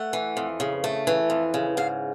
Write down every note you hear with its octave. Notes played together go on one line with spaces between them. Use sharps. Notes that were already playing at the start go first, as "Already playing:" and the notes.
Already playing: A3 F#5
E3
F2
C#3
A3
E3
F2
C#3
G#2 F5